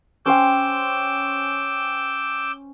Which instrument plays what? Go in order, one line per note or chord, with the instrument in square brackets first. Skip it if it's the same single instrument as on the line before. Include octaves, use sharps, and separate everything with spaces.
[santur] C#4 C5 G5 [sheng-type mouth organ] D6 E6 G6